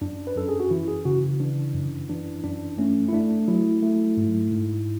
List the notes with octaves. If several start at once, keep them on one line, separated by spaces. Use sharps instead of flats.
F#2 D4
B4
F#2 A4
G#4
F#4
E3 E4
G#4
C#3 F#4
E3 D4
F#2
E3 D4
F#2 D4
A3 C#4
E4
A3 D4
F#3 E4
A3
G#2
G#2